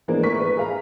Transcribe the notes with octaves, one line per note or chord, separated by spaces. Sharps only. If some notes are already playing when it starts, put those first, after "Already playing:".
E3 F3 G#3 A#3 B3 D4
A2 A#4 C#6 B6
B4
G#4 F5 A#5